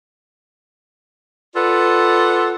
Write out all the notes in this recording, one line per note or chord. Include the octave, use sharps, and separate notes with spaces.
F4 A4 B4 D5 F#5